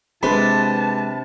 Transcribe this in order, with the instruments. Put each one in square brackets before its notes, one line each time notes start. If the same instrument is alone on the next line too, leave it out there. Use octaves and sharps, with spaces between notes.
[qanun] C3 D4 [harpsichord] G#3 [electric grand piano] B4 B5 [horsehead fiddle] A5